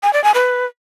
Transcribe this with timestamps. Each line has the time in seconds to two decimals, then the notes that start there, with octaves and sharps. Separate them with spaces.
0.03 G#5
0.13 D5
0.24 G#5
0.34 B4